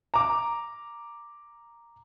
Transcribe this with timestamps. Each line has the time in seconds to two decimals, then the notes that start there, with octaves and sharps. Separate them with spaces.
0.14 A#5 D6